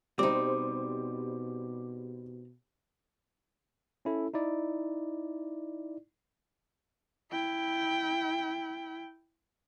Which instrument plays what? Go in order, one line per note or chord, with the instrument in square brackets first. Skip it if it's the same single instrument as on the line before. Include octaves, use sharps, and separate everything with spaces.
[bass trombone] B2 [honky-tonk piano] G3 C5 [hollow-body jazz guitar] C4 D#4 [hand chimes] D6
[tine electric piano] C#4 E4 A4
D#4 E4 D5
[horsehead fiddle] E4 G5